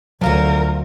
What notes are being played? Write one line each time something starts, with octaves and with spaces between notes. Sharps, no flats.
D2 F3 F#3 F4 F#4 A#4